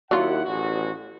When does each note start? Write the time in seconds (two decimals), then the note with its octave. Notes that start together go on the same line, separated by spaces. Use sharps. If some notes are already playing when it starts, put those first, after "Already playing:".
0.11 D#2 F#3 E4 F4 F#5
0.45 A1 E2 F#4